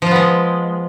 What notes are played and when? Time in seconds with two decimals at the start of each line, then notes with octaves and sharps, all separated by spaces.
0.02 F3
0.07 F4
0.11 B3
0.16 G#3